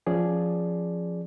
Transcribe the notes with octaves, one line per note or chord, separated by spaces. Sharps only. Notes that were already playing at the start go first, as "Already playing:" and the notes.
F3 C#4 G#4 D5